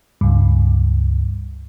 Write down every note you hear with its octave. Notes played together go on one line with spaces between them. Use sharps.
C#2 G2